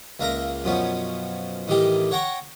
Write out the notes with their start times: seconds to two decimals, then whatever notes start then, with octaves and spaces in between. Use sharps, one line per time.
0.20 C#2 A#3 A#4 E5 A#5
0.64 F#2 B2 F3 B3 C#4
1.68 A2 D#3 E3 G3 D#4 G4
2.11 C#5 F#5 G5 A#5 C#6